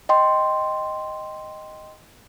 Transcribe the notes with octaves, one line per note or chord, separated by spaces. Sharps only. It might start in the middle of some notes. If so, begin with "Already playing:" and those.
D#5 G5 C6